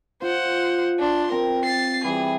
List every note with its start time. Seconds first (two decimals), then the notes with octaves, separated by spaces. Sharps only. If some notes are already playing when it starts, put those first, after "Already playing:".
0.22 F4 C5 F#5
0.99 D4 C6
1.32 C4 A#4
1.64 A6 C7
2.04 E3 G3 G#4